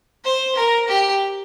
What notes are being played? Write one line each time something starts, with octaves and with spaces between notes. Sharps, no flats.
C5
A#4
G4